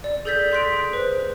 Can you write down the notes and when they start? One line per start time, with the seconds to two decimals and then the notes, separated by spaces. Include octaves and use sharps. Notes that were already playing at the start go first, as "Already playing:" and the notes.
0.04 D5
0.25 G#4 A4 G6 A6 B6
0.52 G#4 C6 F#6 B6 D7
0.93 B4 C5